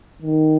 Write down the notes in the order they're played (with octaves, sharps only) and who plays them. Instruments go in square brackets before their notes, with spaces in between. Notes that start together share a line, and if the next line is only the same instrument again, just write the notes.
[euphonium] D#3